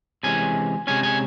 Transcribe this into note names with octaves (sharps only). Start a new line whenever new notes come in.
C3 E3 G#3 C#4 G#5
C3 E3 G#3 C#4 G#5
G#5